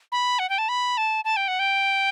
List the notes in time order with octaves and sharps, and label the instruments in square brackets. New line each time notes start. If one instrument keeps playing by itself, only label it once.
[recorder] B5
F#5
G5
A5
B5
A5
A5
G5
F#5
G5